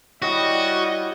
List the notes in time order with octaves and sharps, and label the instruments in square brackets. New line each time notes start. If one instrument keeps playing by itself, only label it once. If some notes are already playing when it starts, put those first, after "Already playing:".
[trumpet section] G3 D#5 [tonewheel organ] E4 G4 C#5 [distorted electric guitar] F#4